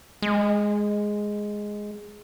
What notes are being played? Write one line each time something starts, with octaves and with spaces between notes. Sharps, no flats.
G#3